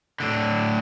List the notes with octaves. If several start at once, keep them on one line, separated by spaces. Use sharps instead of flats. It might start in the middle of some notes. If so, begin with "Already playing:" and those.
A2 D3